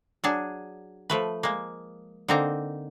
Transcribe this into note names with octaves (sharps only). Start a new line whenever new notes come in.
F#3 D4 G#4
F3 A3 B4
G#3 A#3
D3 A#3 C4 D#4 A#5